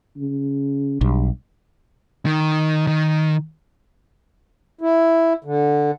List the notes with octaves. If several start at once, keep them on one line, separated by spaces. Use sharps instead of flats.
C#3
B1 G2
D#3
D#3
E4
D3